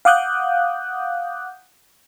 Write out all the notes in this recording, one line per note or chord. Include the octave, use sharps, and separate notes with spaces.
F5 F#5 D6 D#6 F#6 G6